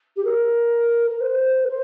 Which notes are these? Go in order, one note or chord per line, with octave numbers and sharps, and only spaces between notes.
G4
A#4
A#4
C5
A#4
C5